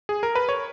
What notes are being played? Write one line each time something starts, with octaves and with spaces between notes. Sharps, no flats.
G#4
A#4
B4
C#5